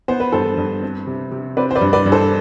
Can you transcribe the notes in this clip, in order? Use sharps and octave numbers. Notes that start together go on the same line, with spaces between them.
B3 C5
B4
G2 A4 C5
G2
C4
C3
C3
C4 B4 D5
C5
B4 D5
G2
B4 D5
G2
A4 C5